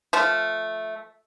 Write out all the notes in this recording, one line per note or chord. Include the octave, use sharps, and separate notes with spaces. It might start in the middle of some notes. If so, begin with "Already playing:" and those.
F3 A3